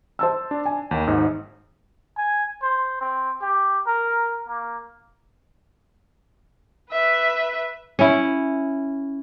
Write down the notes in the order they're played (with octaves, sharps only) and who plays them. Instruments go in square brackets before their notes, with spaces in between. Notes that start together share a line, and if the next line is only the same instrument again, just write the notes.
[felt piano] C5 A5 E6
[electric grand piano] D4
[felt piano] G#5
[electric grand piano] D#2 D#3
G#1 G#2 D#4
[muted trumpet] G#5
C5
C4
G4
A#4
A#3
[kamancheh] B4 E5
[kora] C#4 E4